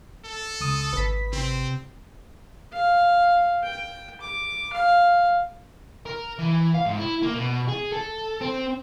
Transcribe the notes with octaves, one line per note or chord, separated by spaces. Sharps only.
A4
C#2 D#6
G#1 B4 B6
C3 C4
F5
G5
D6
F5
A#4
E3
F5
G#2
E4
A#3
B2
G#4
A4
C4